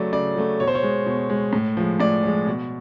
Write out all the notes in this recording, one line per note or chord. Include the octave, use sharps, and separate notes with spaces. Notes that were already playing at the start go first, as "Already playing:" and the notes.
Already playing: C#3 F#3 A3 D5
C#3 D5
F#3 A3
B2 C#5
C5
C#5
G#3
B2
G#3
A2
F3 G#3
A2 D5
F3 G#3
B2